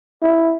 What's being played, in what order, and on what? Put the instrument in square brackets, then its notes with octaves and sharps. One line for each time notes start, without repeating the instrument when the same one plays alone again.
[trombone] E4